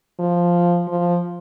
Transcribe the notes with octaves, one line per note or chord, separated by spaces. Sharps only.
F3
F3